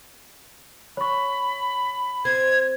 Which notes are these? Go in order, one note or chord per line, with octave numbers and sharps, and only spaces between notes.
C#5 B5 C#6
C4 G#6